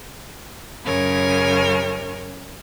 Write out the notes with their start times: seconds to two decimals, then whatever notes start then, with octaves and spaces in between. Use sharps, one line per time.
0.84 F#2 C#3 A#4 C#5 G#5